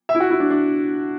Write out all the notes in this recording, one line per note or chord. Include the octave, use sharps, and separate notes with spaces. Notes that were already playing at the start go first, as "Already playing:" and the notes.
E5
E4
F#4
E4
D4
D4